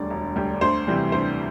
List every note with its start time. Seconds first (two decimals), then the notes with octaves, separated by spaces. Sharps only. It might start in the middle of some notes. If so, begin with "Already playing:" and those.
Already playing: E1 D2 D3 G3 D5
0.10 E1
0.36 D2 D3 G3
0.61 D2 C5
0.88 C3 E3 G3
1.12 D2 C5